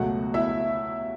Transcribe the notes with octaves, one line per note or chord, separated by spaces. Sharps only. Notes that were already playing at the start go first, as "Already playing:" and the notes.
Already playing: C#2 B2 F#3 A3 F#4 F#5
E4 E5